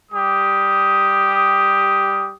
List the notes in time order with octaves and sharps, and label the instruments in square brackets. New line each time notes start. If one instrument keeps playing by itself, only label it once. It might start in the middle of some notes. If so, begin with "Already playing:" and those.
[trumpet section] G3 G4 D#6